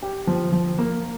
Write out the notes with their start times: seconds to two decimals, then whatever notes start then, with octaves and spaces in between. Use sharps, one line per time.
0.03 G4
0.27 F3
0.52 F3
0.78 A#3